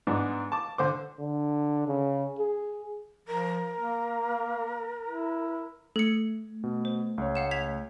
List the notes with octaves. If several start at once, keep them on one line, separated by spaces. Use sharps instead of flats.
G#2 B3 D4
A5 D6
D3 C5 D6
D3
C#3
G#4
F3 A#4
A#3
E4
A3 A4 C#7
B2
C5
C#2 C#5
F5 F#5 E7
G#6 B6 F7